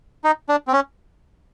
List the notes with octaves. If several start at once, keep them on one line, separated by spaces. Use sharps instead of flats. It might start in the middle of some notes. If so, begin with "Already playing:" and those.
D#4
D4
C4
C#4